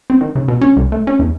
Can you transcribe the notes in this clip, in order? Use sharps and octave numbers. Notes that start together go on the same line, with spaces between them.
C4
D#3
C#3
B2
C#4
C2
A3
C#4
E2